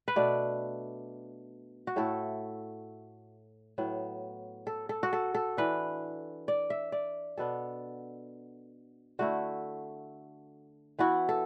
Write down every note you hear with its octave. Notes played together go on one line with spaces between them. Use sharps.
B4
B2 A3 D4 D5
F#4
A2 A3 E4 A4
A2 F#3 B3
A4
A4
F#4
A4
A4
E3 D4 B4
D5
E5
D5
B2 B3 D4 A4
D3 A3 E4 F#4
E3 B3 E4 F#4
A4